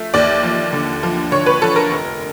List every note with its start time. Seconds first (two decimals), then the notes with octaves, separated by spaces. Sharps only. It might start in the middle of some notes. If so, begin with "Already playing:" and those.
Already playing: F3 A3 E5
0.14 D#2 D5
0.43 F3
0.73 D3
1.03 F3
1.31 D3 C#5
1.46 B4
1.62 F3 A4
1.76 A#4
1.91 F1